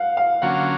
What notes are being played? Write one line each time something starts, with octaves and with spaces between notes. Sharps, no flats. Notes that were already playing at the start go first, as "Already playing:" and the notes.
Already playing: F5 F#5
F5
D3 F#3 A#3 C#4 F4 F#5